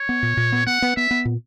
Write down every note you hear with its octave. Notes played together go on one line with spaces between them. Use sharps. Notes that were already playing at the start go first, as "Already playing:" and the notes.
Already playing: C#5
B3
A#2
A#2
B3
B3 F#5
B3
B3 E5
B3
A#2